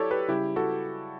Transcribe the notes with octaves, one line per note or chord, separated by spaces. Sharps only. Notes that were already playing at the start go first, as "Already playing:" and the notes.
Already playing: F#3 E4 G4 A4 C#5 D5
G4 B4
C#3 G3 E4 G4
F#4 A4